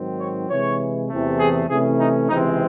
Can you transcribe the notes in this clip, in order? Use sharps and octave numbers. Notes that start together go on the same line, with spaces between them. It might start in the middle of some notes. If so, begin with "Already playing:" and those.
Already playing: G#2 D#3 F#3 C4
C#5
C3 E3 G#3 C#5
E2 C3 E3 A3
G#4
C3 E3 A3 C#4 G#4
D#4
C#2 C3 E3 G#3 C4 D#4